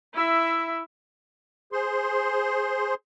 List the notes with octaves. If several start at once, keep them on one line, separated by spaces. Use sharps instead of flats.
E4 E5
G#4 C5 C6